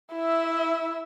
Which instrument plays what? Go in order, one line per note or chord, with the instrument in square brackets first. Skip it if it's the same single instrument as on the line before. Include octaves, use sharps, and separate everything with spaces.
[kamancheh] E4 E5